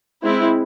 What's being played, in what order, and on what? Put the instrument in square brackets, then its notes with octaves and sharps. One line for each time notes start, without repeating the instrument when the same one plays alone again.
[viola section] G#3 C4 E4